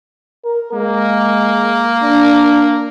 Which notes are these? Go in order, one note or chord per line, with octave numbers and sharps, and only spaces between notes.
A#4
G#3 A#3
D4